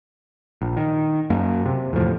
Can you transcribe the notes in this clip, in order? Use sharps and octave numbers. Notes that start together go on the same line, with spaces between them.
A#1
D#3
F#2 A#3
C3
E2 A2 F3